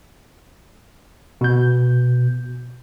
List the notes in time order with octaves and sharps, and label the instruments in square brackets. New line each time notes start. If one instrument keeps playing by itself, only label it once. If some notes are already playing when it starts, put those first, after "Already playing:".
[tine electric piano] B2 G6